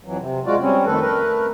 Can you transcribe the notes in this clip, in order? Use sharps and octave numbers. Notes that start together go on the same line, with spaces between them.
F2 E3 F#3
C3
G#3 F4 F#4 D5
G3 C4 C#4
F2 D#3 A3 A4 B4
A3 A#4 B4